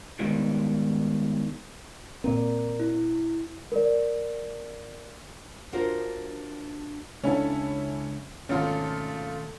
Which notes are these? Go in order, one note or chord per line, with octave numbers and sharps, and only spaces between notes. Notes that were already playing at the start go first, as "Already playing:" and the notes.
G#2 B2 D#3 G3
A#2 A#3 C4 A#4 D5
E4
A#4 D5
D4 F4 F#4 A#4 C5
C#2 C#4 D4 E4 A4 E5
G#1 B2 D#3 A3 C#4 F4 A4